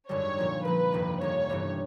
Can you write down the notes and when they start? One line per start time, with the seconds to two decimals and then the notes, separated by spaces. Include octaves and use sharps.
0.09 G#1 F#2 D3 G3 C#5
0.37 A#2 F3 A#3
0.65 A#2 F3 A#3 B4
0.92 G1 F2 C3 D#3
1.21 G1 F2 C3 D#3 C#5
1.49 G1 G2 E3 G3 B3